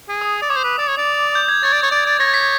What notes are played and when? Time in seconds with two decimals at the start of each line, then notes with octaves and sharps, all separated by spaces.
0.08 G#4
0.21 D#6
0.42 D5
0.49 C#5 D6
0.56 C5
0.64 B4
0.78 D5 D#6
0.87 C#5
0.98 D5
1.35 G6
1.48 G#6
1.63 C#5 A6
1.73 D5
1.83 C#5
1.91 D5
2.06 D5
2.19 C#5 A#6
2.34 B6